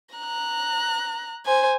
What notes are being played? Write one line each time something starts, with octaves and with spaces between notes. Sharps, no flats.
A#5 F#6
C5 G#5